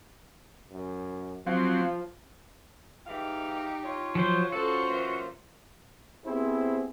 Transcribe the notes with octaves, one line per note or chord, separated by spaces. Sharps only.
F#2
F3 F#3 C4 F5
E3 G#3 D#4 G4 F5
F4 C#5
F3 F#3 C5
C#4 F4 F#4 A4 C5
E3 F#3 A#3
B3 C4 E4 G4 G#4 C5